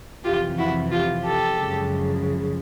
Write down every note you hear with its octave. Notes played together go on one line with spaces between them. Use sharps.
F2 C3 E3 F4 G4
E4 F#4
F4 G4
G4 A4
F#2 C#3 F3 G#3